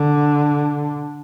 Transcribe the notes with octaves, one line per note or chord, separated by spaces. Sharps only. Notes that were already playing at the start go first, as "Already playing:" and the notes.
Already playing: D3